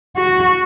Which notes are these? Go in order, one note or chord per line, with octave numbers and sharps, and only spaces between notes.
F#4